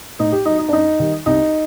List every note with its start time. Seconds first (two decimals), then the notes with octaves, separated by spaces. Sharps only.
0.19 A2 D#4
0.32 G4
0.45 F#3 D#4
0.59 D#4
0.69 D4
0.73 F#2 D#4
0.99 D#3 G3
1.26 C2 D#4